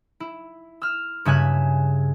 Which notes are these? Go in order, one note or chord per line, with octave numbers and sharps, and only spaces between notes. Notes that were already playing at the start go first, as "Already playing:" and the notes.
E4
E6 F6
G2 C#3 E5 G#5 F#6